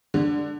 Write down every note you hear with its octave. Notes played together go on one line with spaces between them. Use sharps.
D3